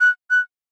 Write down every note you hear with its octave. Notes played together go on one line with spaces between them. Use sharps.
F#6
F#6